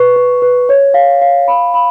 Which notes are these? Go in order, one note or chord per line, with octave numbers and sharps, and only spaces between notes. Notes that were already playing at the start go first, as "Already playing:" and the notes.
Already playing: B4 C#6
B4
B4
C#5
F5
F5
B5
B5